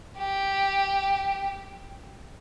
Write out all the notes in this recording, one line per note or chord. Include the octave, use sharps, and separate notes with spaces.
G4